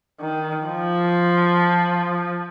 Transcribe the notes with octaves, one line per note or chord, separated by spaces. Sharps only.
D#3
F3